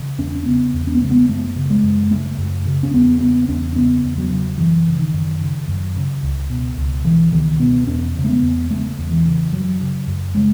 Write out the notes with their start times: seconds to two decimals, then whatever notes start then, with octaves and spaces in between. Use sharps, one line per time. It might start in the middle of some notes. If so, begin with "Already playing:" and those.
Already playing: C#3
0.18 E2 C#4
0.35 C#4
0.46 C#3 B3
0.74 E2
0.87 C#4
0.95 B3
1.01 C#3 A3
1.11 B3
1.28 F#2 A3
1.56 C#3
1.70 G#3
1.83 F#2
2.11 C#3 A3
2.38 F#2
2.65 C#3
2.83 C#4
2.93 E2 B3
3.20 C#3 B3
3.49 E2 C#4
3.76 C#3 B3
4.04 E2
4.17 F#3
4.30 C#3
4.58 F#2 E3
4.86 C#3
4.99 D#3
5.14 F#2
5.41 C#3
5.68 F#2
5.96 C#3
6.23 C#2
6.50 B2
6.78 C#2
7.05 B2 E3
7.32 C#2 D#3
7.60 B2 B3
7.87 E2 C#4
8.16 C#3
8.24 A3
8.28 B3
8.42 E2
8.70 C#3 A3
8.98 E2
9.11 E3
9.25 C#3
9.52 F#2 F#3
9.80 C#3
10.07 F#2
10.35 C#3 G#3